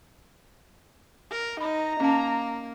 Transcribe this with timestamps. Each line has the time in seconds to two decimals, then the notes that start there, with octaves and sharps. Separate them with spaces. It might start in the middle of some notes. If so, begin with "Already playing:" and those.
1.31 A#4
1.61 D#4 A#5 B5
2.01 A#3 C#4 A5